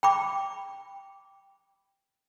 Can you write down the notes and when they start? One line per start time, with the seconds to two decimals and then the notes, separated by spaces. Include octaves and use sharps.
0.03 G5 B5 D6